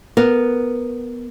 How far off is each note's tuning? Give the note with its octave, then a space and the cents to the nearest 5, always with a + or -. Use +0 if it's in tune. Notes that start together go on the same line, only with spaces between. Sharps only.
B3 +0 A#4 +0